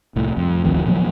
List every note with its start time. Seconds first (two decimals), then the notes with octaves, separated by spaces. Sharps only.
0.16 C2 A2
0.37 F2
0.64 G#1 D2 D#3 F3
0.86 A#2 F3 F#3 A#3